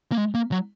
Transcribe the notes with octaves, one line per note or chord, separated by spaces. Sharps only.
A#3
G#3
A#3
F#3